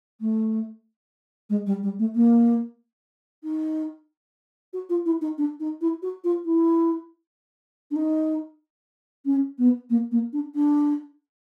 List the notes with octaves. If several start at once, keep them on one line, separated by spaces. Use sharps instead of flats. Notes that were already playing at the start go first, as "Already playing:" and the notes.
A3
G#3
G3
G3
A3
A#3
D#4
F#4
F4
E4
D#4
D4
D#4
E4
F#4
F4
E4
D4
D#4
C#4
B3
A#3
A#3
D4
D4